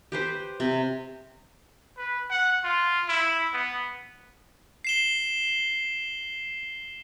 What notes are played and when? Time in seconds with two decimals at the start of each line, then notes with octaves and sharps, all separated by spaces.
0.12 G4 B4 C5
0.60 C3
1.97 B4
2.30 F#5
2.64 F4
3.08 E4
3.53 B3
4.84 C7 E7 G7